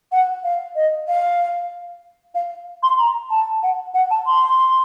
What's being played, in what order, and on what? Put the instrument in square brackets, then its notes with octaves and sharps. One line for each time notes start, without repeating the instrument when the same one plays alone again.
[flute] F#5
F5
D#5
F5
F5
C6
A#5
A5
F#5
F#5
A5
C6